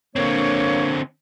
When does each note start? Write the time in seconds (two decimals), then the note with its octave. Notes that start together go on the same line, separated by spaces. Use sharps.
0.16 D3 A#3 C4 D4 C#5